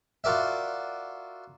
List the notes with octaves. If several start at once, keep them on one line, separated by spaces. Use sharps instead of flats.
F4 F#4 A#4 D5 E5